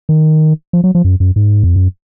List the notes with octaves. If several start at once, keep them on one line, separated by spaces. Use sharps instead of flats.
D#3
F3
F#3
F3
F#2
F#2
G#2
F2
F#2